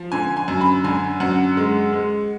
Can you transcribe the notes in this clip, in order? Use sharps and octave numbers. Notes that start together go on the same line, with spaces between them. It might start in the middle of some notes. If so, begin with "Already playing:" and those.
Already playing: F3
D3 G#5
G#5
F#2
B5
D3 G#5
F#2 F#5
G#3
G#3